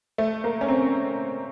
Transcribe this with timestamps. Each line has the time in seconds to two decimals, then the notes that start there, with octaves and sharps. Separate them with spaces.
0.18 A3
0.44 A#3
0.61 C#4
0.68 C4